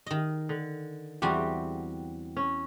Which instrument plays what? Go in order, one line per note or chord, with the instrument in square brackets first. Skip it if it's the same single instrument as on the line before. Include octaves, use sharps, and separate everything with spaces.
[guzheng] D#3 D#5
[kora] D3
[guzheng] E2 C4 G#5 [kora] G3 F#4 G4
[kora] C#4